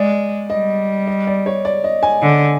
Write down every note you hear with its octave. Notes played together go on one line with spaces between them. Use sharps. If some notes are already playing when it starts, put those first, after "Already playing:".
Already playing: G#3 D5
G3 D#5
D#5
D5
C#5
D5
D#5
G#5
D3